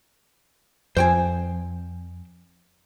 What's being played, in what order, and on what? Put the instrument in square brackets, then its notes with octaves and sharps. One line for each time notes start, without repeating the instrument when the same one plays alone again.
[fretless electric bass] F2 [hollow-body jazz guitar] C5 G5 G#5